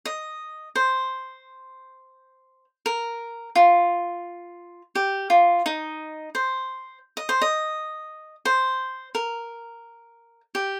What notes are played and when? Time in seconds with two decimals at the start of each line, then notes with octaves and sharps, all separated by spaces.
0.05 D#5
0.75 C5
2.86 A#4
3.56 F4
4.95 G4
5.30 F4
5.66 D#4
6.35 C5
7.17 D#5
7.29 C5
7.42 D#5
8.45 C5
9.15 A#4
10.55 G4